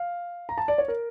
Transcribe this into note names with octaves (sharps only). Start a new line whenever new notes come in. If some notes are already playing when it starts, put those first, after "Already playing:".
Already playing: F5
A#5
A5
D5
C#5
A#4